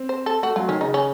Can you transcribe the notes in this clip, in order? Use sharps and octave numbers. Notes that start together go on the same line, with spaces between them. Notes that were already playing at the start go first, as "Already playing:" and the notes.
Already playing: C4
C5
A4
A3 F#4
F#3 F4
D#3 C#4
C#3 D#4
C#4